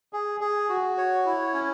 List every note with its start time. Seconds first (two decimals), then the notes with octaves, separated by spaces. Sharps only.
0.13 G#4
0.41 G#4
0.69 F#4
0.98 C#5
1.25 E4
1.54 C#4